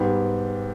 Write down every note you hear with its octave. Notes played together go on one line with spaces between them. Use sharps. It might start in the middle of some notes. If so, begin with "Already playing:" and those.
Already playing: G#2 G3 B3 G4